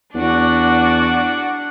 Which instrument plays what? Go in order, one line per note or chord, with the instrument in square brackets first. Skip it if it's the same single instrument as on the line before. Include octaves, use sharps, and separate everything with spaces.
[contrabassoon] E2 [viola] D4 F#5 [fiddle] F#4 D5